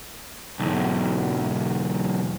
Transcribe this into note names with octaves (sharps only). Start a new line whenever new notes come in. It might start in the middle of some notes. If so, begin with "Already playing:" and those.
B1 E2